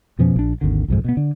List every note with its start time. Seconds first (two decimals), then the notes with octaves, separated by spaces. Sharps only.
0.19 F2 B2 F3 C#4
0.36 A#1 D4
0.61 G#1 D#2 D3
0.88 B1 F2 G#2
1.04 B2 B3
1.17 D3